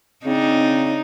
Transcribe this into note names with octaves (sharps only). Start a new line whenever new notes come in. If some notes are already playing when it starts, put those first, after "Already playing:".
C#3 C4 D4 D#4